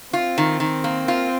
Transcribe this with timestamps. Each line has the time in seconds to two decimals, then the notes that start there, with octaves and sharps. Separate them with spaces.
0.13 C4 F4
0.38 D#3
0.60 D#3
0.84 A#3
1.08 F4